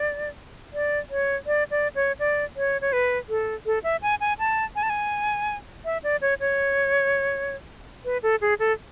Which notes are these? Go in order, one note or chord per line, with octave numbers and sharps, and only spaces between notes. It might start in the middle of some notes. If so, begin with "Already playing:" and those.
Already playing: D5
D5
C#5
D5
D5
C#5
D5
C#5
C#5
B4
A4
A4
E5
G#5
G#5
A5
G#5
A5
G#5
E5
D5
C#5
C#5
B4
A4
G#4
A4